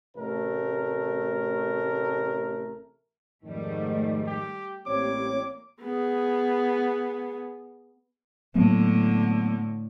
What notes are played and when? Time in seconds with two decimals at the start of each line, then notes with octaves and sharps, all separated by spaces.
0.16 A1 C3 A3 A#4
3.44 F2 G#2 D#3 G3 A3
4.27 G4
4.86 A1 G3 A#3 C4 C#5 D6
5.81 B3 G#4
8.55 A2 D3 F#3 A#3 B3